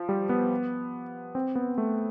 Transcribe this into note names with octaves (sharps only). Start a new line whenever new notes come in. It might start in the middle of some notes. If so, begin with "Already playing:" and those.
Already playing: F3
G3
B3
C4
B3
A3